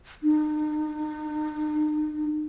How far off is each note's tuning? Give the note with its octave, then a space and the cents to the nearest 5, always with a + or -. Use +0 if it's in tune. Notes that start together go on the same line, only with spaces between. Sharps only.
D#4 -40